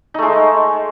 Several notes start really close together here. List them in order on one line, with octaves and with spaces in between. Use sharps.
D#4 A3 G#3